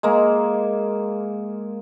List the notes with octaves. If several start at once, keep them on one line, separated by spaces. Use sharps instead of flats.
G#3 A#3